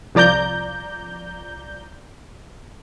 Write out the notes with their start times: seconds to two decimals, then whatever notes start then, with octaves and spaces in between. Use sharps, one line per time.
0.15 C2 F3 D5 A#5 G6